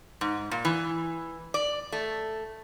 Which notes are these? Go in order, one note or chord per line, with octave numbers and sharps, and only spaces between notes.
G#2
A#2
E3
D5
A3